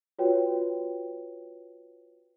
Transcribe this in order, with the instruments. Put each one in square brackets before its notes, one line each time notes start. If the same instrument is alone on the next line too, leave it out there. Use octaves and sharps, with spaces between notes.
[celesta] F4 F#4 B4 C#5 G5